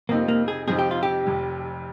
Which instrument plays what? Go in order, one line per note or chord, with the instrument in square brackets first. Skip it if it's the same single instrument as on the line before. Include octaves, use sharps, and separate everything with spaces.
[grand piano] F2 C3 F3 C4 D#4 [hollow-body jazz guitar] A#3
[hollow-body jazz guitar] A#3
G#4
[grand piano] F2 C3 F3 C4 D#4 [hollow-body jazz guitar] G#4
[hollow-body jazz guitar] G4
F4
G4
[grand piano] F1 F2 C3